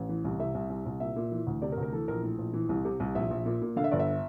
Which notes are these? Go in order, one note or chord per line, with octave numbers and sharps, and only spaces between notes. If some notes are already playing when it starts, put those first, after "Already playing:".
Already playing: A1
E3
C2
C3 E5
C2
C2
C2
A#2 E5
A#2
E3
D2
C3 D5
A#4
D2
A#4
E3 A4
A#1 A#4
A2
A#1
E3
C2
C3
C2
A#1 E5
A#1
A#2
A#2
D3 F5
E5
G1 D5
E5